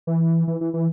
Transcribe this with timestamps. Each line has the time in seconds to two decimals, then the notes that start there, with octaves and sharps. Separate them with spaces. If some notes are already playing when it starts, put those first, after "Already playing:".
0.07 E3
0.48 E3
0.61 E3
0.74 E3